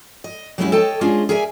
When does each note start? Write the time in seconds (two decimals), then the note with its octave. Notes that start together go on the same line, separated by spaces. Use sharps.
0.24 D#5
0.58 F#3 G#3 B3 C#4 E4 G4
0.72 A4 C#5 D#5 G5 A5
1.01 G#3 C#4 D4 F4 G#4 D#5
1.29 G#4 A#4 D5 E5 G#5